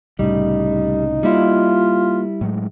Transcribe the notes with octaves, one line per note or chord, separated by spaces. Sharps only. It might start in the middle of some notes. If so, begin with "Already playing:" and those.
C2 A2 C#3 G3 D#4
G3 A#3 E4 F4
A2 F#3 G#3